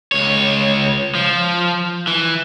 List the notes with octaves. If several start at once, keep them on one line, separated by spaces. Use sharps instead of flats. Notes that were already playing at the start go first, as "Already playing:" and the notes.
C#2 C#5
F3
E3